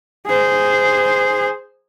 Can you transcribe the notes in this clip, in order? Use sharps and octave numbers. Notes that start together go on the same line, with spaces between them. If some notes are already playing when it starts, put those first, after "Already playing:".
G#4 C5